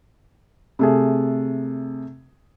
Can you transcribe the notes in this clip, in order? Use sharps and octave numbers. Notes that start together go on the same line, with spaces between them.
C3 A3 G#4